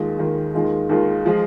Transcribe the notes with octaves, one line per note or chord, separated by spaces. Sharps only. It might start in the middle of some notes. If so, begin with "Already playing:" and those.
Already playing: D#2 D#3 G#3 F4
D#2 D#3 G#3 F4
D#2 D#3 G#3 F4
D#2 D#3 G#3 F4
F3 G#3 F4